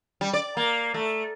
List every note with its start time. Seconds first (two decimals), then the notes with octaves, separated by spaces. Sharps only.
0.21 G3
0.33 D5
0.57 A#3
0.94 A3